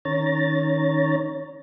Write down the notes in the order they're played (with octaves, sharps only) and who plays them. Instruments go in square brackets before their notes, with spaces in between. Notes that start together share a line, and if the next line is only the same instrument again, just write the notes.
[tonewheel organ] D#3 C#4 C#5 A#5 A6